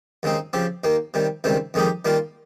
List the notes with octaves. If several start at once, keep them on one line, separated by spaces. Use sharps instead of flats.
D#2 C#3 G#3 C4 D#4
C#3 F3 C4 G4
D#2 D#3 A#3
C3 D#3 G3
C#2 C3 D#3 G3 C4
F2 D#3 G#3 D#4 G4
D#3 G3 A#3 F4